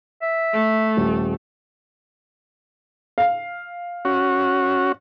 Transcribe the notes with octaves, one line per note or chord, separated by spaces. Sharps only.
E5
A3
D#1
F5
C#4 F#4